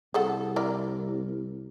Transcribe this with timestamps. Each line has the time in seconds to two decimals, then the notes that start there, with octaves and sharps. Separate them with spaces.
0.14 C2 G#4 A4 F#5
0.56 E4 A#4 D5